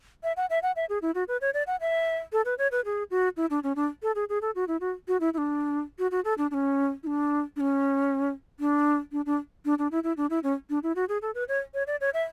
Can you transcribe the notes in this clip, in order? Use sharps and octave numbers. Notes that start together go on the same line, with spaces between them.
E5
F#5
E5
F#5
E5
G#4
E4
F#4
B4
C#5
D5
F#5
E5
A4
B4
C#5
B4
G#4
F#4
E4
D4
C#4
D4
A4
G#4
G#4
A4
F#4
E4
F#4
F#4
E4
E4
D4
F#4
F#4
A4
D4
D4
C#4
E4
D4
D4
C#4
D4
D4
D4
D4
D4
E4
E4
D4
E4
C#4
D4
E4
F#4
G#4
A4
B4
C#5
C#5
D5
C#5
E5